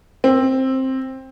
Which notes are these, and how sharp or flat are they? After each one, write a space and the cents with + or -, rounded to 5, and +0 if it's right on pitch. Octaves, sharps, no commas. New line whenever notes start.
C4 +10